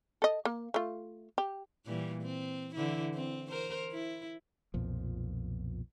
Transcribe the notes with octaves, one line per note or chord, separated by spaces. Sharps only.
A4 D#5
A#3
A3 F4
G4
A#2 E3 G3
C4
D3 E3 E4
C4
A#4 C5
E4
B1 F2 A#2 F3